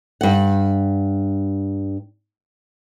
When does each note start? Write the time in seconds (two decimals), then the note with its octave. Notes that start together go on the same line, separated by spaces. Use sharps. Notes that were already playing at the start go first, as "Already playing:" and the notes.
0.21 G2 F#5